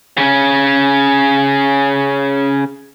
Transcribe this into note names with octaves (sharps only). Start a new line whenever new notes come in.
C#3 C#4